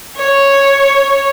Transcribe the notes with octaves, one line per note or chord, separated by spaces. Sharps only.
C#5